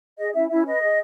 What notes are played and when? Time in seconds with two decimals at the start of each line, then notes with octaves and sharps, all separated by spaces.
0.18 G#4 D#5
0.34 C#4 E4 E5
0.49 C#4 E4 E5
0.66 B4 D#5
0.82 G#4